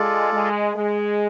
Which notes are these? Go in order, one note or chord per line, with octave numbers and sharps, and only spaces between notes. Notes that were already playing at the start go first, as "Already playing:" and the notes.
Already playing: G#3 F4 A4 D5
G#3
G#3